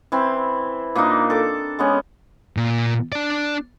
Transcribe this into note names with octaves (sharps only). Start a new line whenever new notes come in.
E3 C4 E4
A#2 A#3 D4 D#4
A4 D6
G#3 B3 C#4
A#2
D4 D5